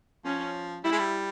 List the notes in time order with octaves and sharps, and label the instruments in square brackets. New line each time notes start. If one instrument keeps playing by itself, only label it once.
[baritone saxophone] F3 [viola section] C#4
[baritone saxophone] G3 [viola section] E4
[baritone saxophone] G#3
G3